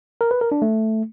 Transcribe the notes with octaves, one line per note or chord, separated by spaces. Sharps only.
A#4
B4
A#4
D4
A3